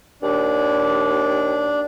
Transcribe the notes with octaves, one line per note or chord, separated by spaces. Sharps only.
D#2 D4